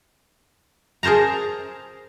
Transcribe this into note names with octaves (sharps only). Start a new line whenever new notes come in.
G#4 A#4 C5 A5 A#5